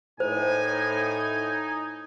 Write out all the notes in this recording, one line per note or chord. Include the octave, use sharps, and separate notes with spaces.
A2 D#4 C5 G#5